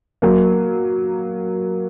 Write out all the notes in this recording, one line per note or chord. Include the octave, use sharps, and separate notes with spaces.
F#3 A#3